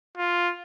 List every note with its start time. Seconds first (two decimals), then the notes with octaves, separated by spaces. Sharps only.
0.18 F4